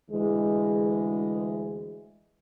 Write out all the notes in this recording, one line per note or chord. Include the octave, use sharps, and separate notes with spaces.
D2 E3 G#3